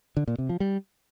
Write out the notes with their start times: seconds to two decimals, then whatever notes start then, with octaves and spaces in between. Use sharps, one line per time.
0.17 D3
0.28 A#2
0.38 C3
0.49 F3
0.60 G3